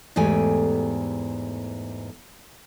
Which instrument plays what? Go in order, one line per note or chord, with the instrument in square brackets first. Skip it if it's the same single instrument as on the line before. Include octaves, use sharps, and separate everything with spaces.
[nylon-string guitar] E2 G#2 A3 G4 G#5